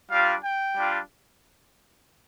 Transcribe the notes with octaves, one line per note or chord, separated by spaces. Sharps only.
G3 D4 F4 F5
G5
G3 D4 F4